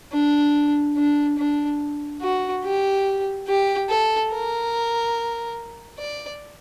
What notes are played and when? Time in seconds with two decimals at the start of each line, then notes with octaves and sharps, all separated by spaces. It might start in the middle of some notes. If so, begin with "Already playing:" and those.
0.12 D4
0.97 D4
1.38 D4
2.22 F#4
2.64 G4
3.48 G4
3.89 A4
4.32 A#4
5.99 D5